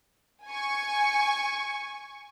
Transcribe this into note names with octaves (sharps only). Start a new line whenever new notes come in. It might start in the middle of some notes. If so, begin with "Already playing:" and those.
G#5 C#6